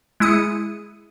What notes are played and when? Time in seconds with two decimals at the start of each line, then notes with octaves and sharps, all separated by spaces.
0.20 G#3 E4 D#6 C#7